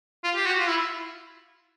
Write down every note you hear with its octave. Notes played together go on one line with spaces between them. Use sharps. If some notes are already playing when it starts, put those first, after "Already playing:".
F4
G4
F#4
F4
E4